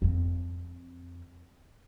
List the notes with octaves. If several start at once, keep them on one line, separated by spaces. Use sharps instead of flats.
F2 C4